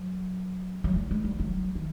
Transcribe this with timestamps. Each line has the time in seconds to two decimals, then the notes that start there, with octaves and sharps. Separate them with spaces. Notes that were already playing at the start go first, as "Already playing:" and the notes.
Already playing: F#3
0.84 F#3
0.96 G3
1.11 G#3
1.24 G3
1.40 F#3
1.75 D#3